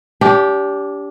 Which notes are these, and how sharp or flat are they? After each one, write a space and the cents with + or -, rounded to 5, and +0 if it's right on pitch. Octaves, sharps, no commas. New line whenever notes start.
D4 -35 G4 +0